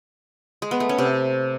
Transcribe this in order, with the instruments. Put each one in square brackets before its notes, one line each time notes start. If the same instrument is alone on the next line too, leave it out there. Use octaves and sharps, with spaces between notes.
[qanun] G#3
B3
A3
C#4
C3